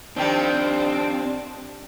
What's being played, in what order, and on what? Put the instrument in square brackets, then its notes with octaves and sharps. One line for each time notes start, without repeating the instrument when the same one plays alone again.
[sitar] F2 D#3 G3 [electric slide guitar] C4 [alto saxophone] D4